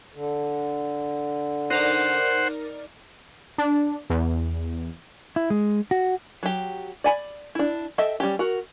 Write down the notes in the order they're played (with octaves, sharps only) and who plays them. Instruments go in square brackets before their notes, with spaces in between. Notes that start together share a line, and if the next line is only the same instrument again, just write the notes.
[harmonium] D3
[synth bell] D#4 A#4 D5 [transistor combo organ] C5 F#5
[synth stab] D4
E2
[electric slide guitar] E4
G#3
F#4
[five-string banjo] F#3 G4
D5 G#5 B5
D4 E4
A4 D#5 E5 G5
G3 C#4 G4
F#4 A#4